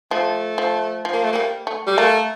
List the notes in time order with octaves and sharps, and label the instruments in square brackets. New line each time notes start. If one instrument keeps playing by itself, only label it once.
[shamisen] F3 [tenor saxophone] A3
[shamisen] F3
F3
[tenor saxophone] A#3
A3
[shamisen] G3 [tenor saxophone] A#3
[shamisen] A3
[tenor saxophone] G3
[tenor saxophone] A3 [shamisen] A#3